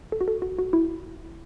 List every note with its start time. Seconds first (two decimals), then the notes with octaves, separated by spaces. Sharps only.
0.12 A4
0.21 F#4
0.28 A4
0.42 F#4
0.59 F#4
0.73 E4